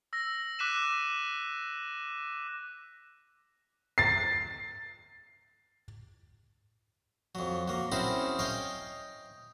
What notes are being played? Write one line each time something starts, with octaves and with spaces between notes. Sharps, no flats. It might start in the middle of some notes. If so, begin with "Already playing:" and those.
E6 A#6
D6 F#6 B6 D#7 E7
A6 C7
F2 F#3
F#3 A#3
C4 C#4 E4 F#4 G#4 A#4
C#5 D#5 F5 G5 G#5